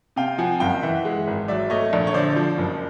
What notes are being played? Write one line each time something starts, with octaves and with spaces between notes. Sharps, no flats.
C3 F5 G5
F3 F#5 G#5
F#1 F5 G5
E3 E5 F#5
G#3
G#1
F#3 D5 E5
A3 C#5 D#5
A#1
C#5
D3 C5 D5
F3
F#1